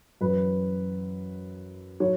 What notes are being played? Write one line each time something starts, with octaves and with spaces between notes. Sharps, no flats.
F#2 E3 B4
F#3 C#5